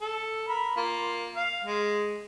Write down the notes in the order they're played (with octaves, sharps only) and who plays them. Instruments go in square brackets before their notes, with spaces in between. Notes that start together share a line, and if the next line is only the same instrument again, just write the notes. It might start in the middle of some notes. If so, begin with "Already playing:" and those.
[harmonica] A4
A#4 B5
A#3 F4
F5
G#3